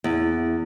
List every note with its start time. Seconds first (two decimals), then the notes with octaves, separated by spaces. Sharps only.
0.04 E2